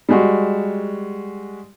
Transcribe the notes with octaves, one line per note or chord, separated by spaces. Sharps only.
G3 G#3 F#4